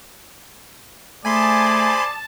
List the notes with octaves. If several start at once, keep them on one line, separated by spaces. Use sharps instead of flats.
A3 G#4 C5 D5 G#5 A5 B5 C6